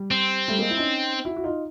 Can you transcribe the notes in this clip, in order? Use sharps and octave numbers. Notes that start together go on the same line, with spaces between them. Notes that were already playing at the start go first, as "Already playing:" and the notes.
Already playing: G3
C4
G3 A3
G#3 A#3
E4
C#4 D#4
E4 F#4
F#4
D#4 F4